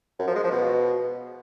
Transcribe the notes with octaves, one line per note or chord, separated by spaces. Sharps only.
F#2
F3
G#3
F3
B2